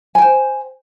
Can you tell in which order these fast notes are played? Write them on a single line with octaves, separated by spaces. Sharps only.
G#5 G5 C5